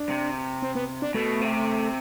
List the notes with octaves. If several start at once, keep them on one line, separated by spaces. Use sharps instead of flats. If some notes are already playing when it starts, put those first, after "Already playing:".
Already playing: D4
C3
C4
B3
D4
B2 A3
C3